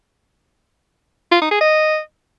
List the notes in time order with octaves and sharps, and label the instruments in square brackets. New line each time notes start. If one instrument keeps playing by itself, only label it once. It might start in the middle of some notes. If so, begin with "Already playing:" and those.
[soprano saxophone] F4
D#4
G#4
D#5